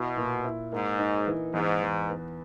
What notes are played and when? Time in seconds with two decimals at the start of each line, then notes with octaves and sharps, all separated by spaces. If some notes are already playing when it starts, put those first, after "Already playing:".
Already playing: B2 E4
0.17 A#2
0.44 E4
0.72 G#2 A#3
0.99 D#4
1.27 E3
1.54 E2 G#2
1.81 E2
2.09 B3